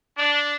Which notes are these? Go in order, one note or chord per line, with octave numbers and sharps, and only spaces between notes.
D4